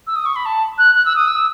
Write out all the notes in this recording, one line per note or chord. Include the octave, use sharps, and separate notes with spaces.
E6
D#6
C#6
B5
A5
F#6
F#6
E6
D#6
E6